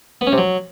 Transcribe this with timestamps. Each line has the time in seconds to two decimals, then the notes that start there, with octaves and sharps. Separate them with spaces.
0.21 B3
0.27 C#4
0.32 C3
0.38 F#3